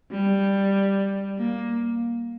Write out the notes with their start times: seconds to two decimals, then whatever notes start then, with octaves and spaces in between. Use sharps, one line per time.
0.11 G3
1.37 A#3